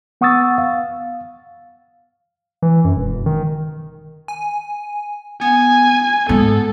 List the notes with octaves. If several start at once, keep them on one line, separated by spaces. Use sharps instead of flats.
B3 F#5 C#6 D#6 E6 A6
F5
E3
F#2
E1
D#3
G#5
B3 G#5
G#2 B3 A4